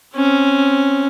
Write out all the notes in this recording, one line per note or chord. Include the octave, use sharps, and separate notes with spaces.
C4 C#4